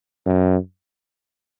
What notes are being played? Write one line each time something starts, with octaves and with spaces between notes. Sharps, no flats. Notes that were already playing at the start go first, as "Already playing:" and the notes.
F#2